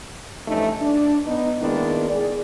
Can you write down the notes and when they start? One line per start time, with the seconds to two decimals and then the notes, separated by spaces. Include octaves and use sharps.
0.47 G2 E3 F3 A3 C#4 D#4
0.80 D4
1.26 B3 D#4
1.62 D#3 G#3 A#3 B3 D4 E4
2.10 G#4 D5